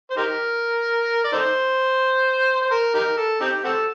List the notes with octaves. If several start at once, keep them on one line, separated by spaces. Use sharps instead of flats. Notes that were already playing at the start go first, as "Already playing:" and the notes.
C5
D#4 G4 A#4
D5
D#4 A4 C5
C5
A#4
D#4 G4 A#4
A4
C4 D#4 G4
C4 F#4 A4